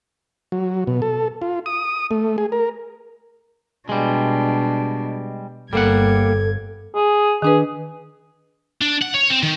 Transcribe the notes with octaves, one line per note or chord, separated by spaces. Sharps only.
F#3
B2
A4
F4
D#6
A3
G#4
A#4
B2 G3 G#3 D4
G1 G3 A#3 A4 F#5 G#6
G#4
D#3 D4 G#4 B4
D4
F#5
C#5
C4
D#3